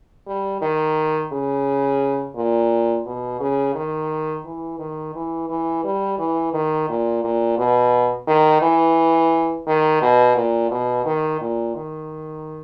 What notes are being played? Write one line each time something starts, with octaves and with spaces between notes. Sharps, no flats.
G3
D#3
C#3
A#2
B2
C#3
D#3
E3
D#3
E3
E3
G3
E3
D#3
A#2
A#2
B2
D#3
E3
D#3
B2
A#2
B2
D#3
A#2
D#3